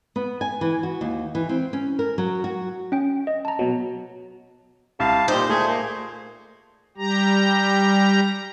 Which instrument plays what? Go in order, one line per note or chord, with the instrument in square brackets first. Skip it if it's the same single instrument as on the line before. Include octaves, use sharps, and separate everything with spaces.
[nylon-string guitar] B3
G#5
E3
F#4
D#2
E3
C4
C#4
A#4
F#3
F#4
[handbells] C#4 G5
D#5
A5 A#5
[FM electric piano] B2 F#3
[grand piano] C2 [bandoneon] F5 A5
[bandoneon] A#2 [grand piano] D#4 G4 [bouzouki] C5
[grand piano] A3 [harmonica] G#4
[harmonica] A#3
[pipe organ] G3 G4 A#5